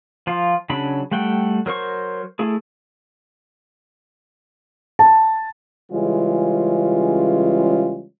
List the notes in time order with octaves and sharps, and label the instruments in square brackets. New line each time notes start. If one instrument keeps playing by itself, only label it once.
[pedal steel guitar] F3 F4
C#3 F#3 D4 B5
G3 A3 F#5 G5
F#3 A#4 C5 C#6
A3 E4 G#4
[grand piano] A5
[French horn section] C#3 E3 G3 G#3 C#4 F4